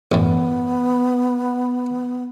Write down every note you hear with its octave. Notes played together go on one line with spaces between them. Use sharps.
A1 F#2 B3